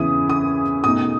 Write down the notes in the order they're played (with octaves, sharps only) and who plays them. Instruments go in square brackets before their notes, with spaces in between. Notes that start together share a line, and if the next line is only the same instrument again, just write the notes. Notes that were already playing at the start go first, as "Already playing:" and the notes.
Already playing: [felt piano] E2 C#3 E3 B3 E4 D#6
D#6
B2 A3 D#4 D#6